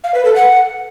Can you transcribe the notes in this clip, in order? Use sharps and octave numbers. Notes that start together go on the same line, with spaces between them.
F5
B4
A4
F#5